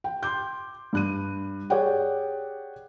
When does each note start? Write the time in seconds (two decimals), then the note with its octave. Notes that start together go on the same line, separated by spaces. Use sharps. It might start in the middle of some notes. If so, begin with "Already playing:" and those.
0.04 G5
0.23 C6 D6 G6
0.93 G2 F#6 D#7
1.70 G4 G#4 C#5 D5 F#5 G5